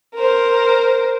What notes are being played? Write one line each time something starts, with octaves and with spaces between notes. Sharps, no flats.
A#4 C5